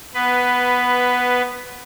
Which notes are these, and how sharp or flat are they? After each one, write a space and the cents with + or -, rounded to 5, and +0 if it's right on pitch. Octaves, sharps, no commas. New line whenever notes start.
B3 +0 B4 +10